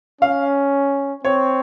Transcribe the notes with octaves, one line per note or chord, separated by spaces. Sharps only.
C#4 F5
C4 C#5